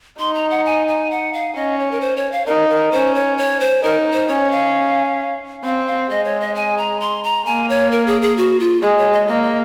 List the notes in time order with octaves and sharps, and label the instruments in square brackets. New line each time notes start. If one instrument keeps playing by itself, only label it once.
[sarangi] D#4 [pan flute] C6
[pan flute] A#5
F#5
G#5
G#5
F#5
F5
[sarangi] C#4 [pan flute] D#5
[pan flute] C#5
A#4
C5
C#5
F5
[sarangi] D#4 [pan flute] A#4
[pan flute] A#4
[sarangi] C#4 [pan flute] C5
[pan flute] C#5
C#5
C5
[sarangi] D#4 [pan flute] A#4
[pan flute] C5
[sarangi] C#4 [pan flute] C#5
[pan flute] F5
[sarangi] C4 [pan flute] F5
[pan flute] F5
[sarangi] G#3 [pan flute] D#5
[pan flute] C#5
D#5
G#5
A#5
C6
A#5
[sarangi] A#3 [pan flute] G#5
[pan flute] C#5
A#4
G#4
G#4
F#4
F4
[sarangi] G#3 [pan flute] G#4
[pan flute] C#5
D#5
[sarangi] A#3 [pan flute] D#5
[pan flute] D#5